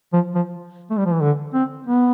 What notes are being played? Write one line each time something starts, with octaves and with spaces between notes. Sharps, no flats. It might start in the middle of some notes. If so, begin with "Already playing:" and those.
F3
F3
A3
G3
F3
E3
D3
C4
B3